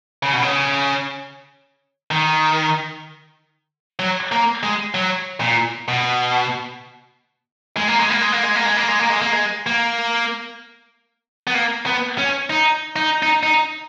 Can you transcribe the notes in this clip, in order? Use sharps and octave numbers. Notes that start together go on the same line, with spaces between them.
C#3
B2
C#3
D#3
F#3
A#3
G#3
F#3
A#2
B2
G#3
A#3
G#3
A#3
G#3
A#3
G#3
A#3
G#3
A#3
G#3
A#3
G#3
A#3
G#3
A#3
B3
A#3
B3
C#4
D#4
D#4
D#4
D#4